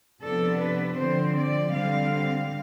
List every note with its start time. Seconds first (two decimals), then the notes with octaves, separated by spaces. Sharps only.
0.22 C3 F3 B3 D4 A4
0.60 B4
0.97 D3 F3 C4 C5
1.36 D5
1.73 D3 G3 C4 F5